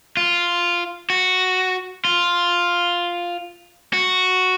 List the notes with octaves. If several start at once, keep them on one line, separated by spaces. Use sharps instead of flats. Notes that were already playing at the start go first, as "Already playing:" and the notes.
F4
F#4
F4
F#4